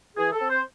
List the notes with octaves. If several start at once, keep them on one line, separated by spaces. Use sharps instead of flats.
E3 G#4
A4
C4
C5